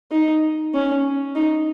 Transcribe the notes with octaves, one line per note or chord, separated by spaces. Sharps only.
D#4
C#4
D#4